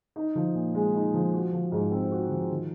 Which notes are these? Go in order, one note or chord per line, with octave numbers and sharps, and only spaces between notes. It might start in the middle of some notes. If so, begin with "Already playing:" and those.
D#4
F3
A#2
G#3
D#4
F3
F#4
F3
G#2
C4
F#4
F3
D#3